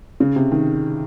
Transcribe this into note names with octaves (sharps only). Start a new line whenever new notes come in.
C#3
C3
D#3